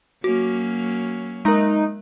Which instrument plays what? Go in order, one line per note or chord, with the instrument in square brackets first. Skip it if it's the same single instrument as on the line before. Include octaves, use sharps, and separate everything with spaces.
[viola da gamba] F#3 A#3 C#4 [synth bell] F#4
[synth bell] G#3 A#4 [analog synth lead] D#4